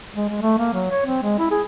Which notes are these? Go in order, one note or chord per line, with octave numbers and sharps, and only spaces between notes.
G#3
G#3
A3
A#3
F#3
C#5
C4
G#3
E4
G#4